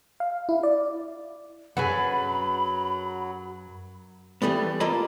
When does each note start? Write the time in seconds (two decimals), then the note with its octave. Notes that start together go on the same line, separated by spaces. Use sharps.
0.20 F5
0.49 E4
0.63 D5
1.77 F#2 F#3 G#4 B4 F#5 B5
4.42 E3 G3 A3 B3
4.80 A#3 F4 A4 D#5 B5